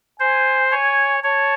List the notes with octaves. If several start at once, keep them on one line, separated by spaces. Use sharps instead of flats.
C5 G#5
C#5 G#5
C#5 A5